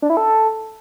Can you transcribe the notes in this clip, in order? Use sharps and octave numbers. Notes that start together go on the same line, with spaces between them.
D4
E4
A4